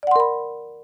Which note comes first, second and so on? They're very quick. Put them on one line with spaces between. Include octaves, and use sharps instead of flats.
D5 F#5 C6 A#4 B5